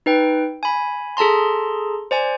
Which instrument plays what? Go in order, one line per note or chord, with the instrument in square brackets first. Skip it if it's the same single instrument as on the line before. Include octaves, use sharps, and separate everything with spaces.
[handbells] D#4 B4 G5
G#5 B5
G#4 A4 A5 A#5 C6
C5 D5 G#5